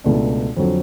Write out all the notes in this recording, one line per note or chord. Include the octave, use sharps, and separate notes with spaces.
C#2 B2 A3 D4
F2 D3 F#3